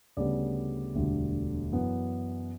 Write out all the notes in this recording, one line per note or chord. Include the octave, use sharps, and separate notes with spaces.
D2 C#3 G3 B3 D5
E1 D2 D3 G3
F#2 E3 B3